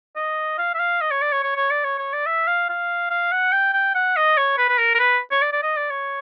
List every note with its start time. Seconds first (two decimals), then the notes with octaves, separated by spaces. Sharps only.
0.16 D#5
0.58 F5
0.74 E5
0.79 F5
1.01 D#5
1.11 C#5
1.22 D5
1.32 C#5
1.43 C#5
1.56 C#5
1.71 D5
1.84 C#5
1.98 C#5
2.13 D5
2.26 E5
2.47 F5
2.69 F5
3.10 F5
3.32 F#5
3.52 G5
3.73 G5
3.95 F#5
4.16 D#5
4.37 C#5
4.58 B4
4.69 B4
4.78 A#4
4.95 A#4
4.99 B4
5.31 C#5
5.42 D5
5.53 D5
5.63 D#5
5.77 D5
5.90 C#5